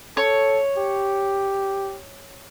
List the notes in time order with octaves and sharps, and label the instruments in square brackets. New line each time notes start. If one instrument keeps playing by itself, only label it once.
[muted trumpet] A4 [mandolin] C#5
[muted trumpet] G4